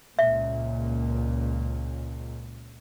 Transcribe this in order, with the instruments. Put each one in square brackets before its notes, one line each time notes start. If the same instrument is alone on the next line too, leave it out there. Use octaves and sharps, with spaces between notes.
[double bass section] C#2 A#2 [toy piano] E5